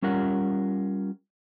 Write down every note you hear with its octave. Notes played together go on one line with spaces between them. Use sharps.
G3 C#4 F4 A#4 F#5